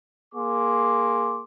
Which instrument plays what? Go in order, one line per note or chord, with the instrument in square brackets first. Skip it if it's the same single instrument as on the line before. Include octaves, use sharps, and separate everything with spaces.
[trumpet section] A#3 G#4 C6 D6